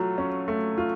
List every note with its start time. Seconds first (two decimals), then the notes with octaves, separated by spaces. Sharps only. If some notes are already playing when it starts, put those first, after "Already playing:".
Already playing: F#3 A3 F4
0.18 C#4
0.48 A3
0.78 F4